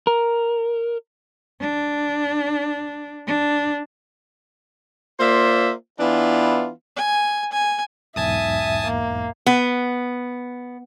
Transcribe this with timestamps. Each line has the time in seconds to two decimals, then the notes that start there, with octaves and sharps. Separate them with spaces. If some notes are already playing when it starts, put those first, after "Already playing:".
0.07 A#4
1.60 D4
3.27 D4
5.19 A#3 F4 C5 D5 E5
5.99 E3 B3 D4 E4 F4
6.96 G#5
7.52 G#5
8.16 B1 E2 G#2 E5 G#5 A5 D#6
8.87 A#3
9.46 B3